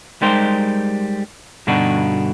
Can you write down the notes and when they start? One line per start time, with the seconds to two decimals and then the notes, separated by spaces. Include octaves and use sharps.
0.22 G3 G#3 D#4 G4 A#4 C5
1.67 G2 B2 D3 D4 D#4 F#4